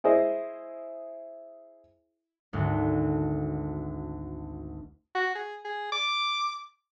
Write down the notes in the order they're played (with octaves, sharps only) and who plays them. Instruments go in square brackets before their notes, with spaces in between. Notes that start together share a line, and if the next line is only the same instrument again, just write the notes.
[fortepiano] E4 G#4 C5 D#5
[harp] G#1 D2
[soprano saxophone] F#4
G#4
G#4
D6